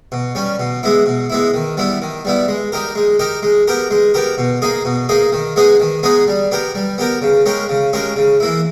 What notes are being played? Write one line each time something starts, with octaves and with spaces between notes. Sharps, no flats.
B2
G3 C#4
B2
G#3 B3 E4
B2
G#3 B3 E4
D#3
G3 B3 E4
D#3
G3 B3 E4
G#3
D#4 G4 A#4
G#3
D#4 G4 A#4
G#3
B3 G4 A#4
G#3
B3 G4 A#4
B2
A#3 D#4 G#4
B2
A#3 D#4 G#4
D#3
G#3 B3 D#4 G#4
D#3
G#3 B3 D#4 G#4
G3
B3 G4 A#4
G3
B3 G4 A#4
C#3
G#3 C#4 G4 A#4
C#3
G#3 C#4 G4 A#4
C#3
E3 A#3 E4